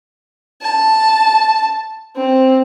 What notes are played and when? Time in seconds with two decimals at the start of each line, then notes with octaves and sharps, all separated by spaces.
0.62 A5
2.16 C4